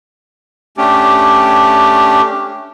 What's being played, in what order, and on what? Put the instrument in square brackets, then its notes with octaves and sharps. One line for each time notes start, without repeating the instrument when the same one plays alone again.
[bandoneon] A3 C#4 D4 G4